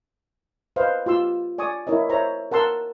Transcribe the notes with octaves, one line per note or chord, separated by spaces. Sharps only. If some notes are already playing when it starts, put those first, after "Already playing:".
B4 C5 D#5 F5
F4 G4 C6 E6
D5 G#5 C#6 D#6
E4 A#4 C#5 D#5
C5 C#5 E5 A#5
A#4 F#5 A5 C6 E6